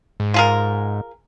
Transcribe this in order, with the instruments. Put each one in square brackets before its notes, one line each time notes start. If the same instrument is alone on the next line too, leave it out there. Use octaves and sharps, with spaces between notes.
[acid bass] G#2
[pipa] F4 G#4 A#4